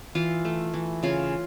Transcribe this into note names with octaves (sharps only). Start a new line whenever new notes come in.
E3 F4
A3
E3
C#3 F4